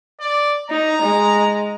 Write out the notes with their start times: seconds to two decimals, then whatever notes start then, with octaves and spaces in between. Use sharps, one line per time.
0.20 D5
0.70 D#4 A#5
1.02 G#3